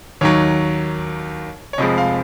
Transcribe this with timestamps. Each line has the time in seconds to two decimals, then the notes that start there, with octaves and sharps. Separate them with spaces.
0.21 D#2 D#3 F#3 C#5
1.73 C#5
1.78 F1 F2 F3 G#3 D#5
1.98 F5